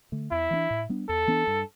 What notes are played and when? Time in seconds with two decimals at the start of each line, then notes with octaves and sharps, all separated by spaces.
0.12 D3 A3
0.31 E2 E4
0.51 E3 B3 D4
0.71 A2
0.89 G3 B3 D4
1.09 E2 A4
1.28 E3 B3 D4
1.47 G2